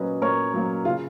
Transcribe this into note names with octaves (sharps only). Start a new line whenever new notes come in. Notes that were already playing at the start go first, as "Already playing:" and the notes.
Already playing: A#2 F#3 A#3 C#4 B4 D#5
A#2 A#4 C#5
F#3 A#3 C#4
C#3 F4